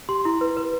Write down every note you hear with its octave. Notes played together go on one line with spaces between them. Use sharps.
G4 C6
E4
B4
B4